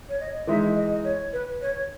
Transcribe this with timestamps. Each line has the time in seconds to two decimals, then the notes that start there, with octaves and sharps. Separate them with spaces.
0.09 C#5
0.20 D#5
0.47 E3 G#3 D#4 E5
0.76 D#5
1.04 C#5
1.33 B4
1.62 C#5